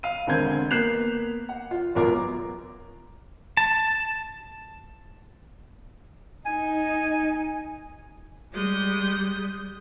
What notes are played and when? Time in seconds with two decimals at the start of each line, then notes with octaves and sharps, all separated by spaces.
0.03 F5 D#7
0.27 E1 D3 C4 A#4 G6 G#6
0.71 A#3 B3 F#6 C7 E7 F7
1.49 F#5
1.71 F4
1.95 C#2 F#2 B2 F4 A#4 D6
3.57 A5
6.46 D#4 G#5
8.52 G3 G#3 D#6 G6